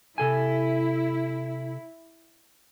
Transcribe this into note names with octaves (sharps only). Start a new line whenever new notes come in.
C3 E4 A4 G#5